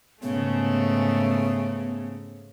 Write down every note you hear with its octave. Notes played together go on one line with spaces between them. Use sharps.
G#2 C#3 A3 B3